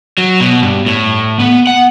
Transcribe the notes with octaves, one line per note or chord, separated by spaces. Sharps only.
F#3
B2
G2
A2
B3
F#5